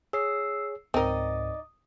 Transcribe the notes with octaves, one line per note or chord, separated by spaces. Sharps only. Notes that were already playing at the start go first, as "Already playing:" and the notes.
G#4 C#5 E6 C7
C#2 G#2 C4 D#4 A#4 D5 D#5 D#6